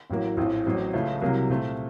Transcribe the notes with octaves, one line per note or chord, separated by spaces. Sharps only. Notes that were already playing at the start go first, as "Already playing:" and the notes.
A1 A2 F#3 A#3
A#1 A2 F3 C4
A1 A2 F#3 C4
C#2 C#3 F3 A3
C2 C3 F#3 A#3
A#2 A3 C4